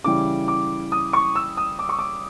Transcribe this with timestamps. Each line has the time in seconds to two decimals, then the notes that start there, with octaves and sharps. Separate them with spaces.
0.04 C#3 E3 G3 D6
0.48 D6
0.92 D#6
1.13 C#6
1.36 E6
1.57 D#6
1.79 D6
1.89 C#6
1.99 D6